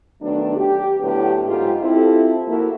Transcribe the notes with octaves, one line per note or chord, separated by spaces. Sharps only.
D#3 F#3 A3 B3 D4
G4
A2 D3 F#3 B3 G4
G#2 F4 G4
C4 E4 F4 G4 A4
F3 A#3 E4 F#4 A4 A#4